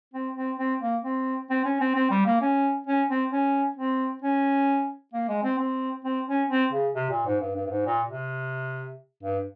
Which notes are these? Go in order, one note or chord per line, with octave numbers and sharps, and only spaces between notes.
C4
C4
C4
A#3
C4
C4
C#4
C4
C4
G3
A#3
C#4
C#4
C4
C#4
C4
C#4
A#3
G#3
C4
C4
C4
C#4
C4
C#3
C3
A#2
G#2
G2
G2
G2
G#2
A#2
C3
G2